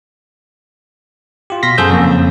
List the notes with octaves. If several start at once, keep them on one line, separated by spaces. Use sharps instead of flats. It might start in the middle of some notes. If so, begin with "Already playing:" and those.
F4 G4
B2 F5 C6 A#6 B6
F#2 G#4 A4 C5 E6 G6
F2 C#3 A#3